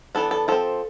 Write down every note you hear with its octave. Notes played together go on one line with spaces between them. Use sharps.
E3 B3 D4 A4
A4
F3 C4 A4